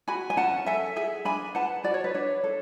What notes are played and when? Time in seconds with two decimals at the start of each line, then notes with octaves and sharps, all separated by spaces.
0.08 F#4 G#5 B5
0.30 G#5
0.37 C#4 F#5 A5
0.66 A4 E5 G#5
0.96 G#4 E5 G#5
1.25 D4 G#5 B5
1.55 B4 F#5 A5
1.84 F#4 D5
1.94 C#5
2.04 B4
2.14 D4 C#5
2.44 A4